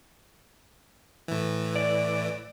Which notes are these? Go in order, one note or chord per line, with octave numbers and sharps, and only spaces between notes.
A2 E3
D5